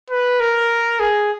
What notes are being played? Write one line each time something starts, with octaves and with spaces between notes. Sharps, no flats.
B4
A#4
G#4